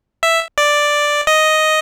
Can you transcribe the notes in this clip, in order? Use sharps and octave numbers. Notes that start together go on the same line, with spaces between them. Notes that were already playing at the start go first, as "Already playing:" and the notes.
E5
D5
D#5